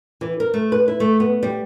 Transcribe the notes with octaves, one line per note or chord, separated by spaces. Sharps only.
E3
A#4
A3
B4
E4
A3
B3
G3